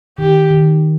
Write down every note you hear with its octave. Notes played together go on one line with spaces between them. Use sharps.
D#3 G4
D#3